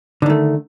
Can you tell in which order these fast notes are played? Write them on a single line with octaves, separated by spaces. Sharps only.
D3 D#3 A3